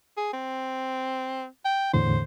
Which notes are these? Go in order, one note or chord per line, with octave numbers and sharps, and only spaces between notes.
G#4
C4
G5
E2 A2 D3 C5